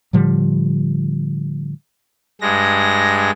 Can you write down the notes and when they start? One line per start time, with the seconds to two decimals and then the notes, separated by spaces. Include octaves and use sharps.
0.13 A2 D3 F3 G3
2.41 G2 G#3 A#6